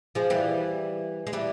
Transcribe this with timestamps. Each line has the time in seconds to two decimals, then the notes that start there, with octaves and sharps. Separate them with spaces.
0.15 F3 G#3
0.30 E3 G3
1.27 G#3
1.33 E3 G3